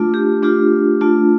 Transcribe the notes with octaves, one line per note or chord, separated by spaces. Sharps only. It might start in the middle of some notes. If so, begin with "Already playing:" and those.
Already playing: A3 D4 F4
G4
A3 D4 F4 G4
A3 D4 F4